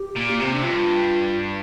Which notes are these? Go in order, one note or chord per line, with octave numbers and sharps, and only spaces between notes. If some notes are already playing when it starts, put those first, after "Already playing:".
Already playing: G4
A#2
A#3
C3 C4
D4
G2 F4